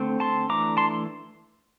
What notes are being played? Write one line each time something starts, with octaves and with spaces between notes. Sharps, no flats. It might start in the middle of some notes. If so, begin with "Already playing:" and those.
Already playing: D3 A3 C4
A5 C6
E3 A3 D4 A#5 D6
A5 C6